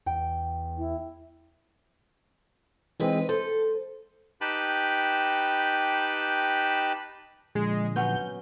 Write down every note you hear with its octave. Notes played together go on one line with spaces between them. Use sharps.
E2 G5
E4
E3 G#3 C4 D#4 B4
A4 C5
D#4 G4 B4 G5 A5 B5
A#2 D3 F3 G#3
F#3 B3 C#4 G6